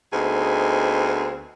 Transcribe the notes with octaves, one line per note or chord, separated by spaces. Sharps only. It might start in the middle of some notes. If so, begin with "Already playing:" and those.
D2 B3 C4 D#4 G#4